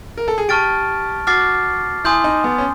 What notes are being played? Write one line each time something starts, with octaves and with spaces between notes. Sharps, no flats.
A#4
A4
G#4
G4 A5 C#6 F6 A6 D7
F#4 D6 F6 A6 C7
E4 G#5 C6 D#6 G6
D#4
B3
C#4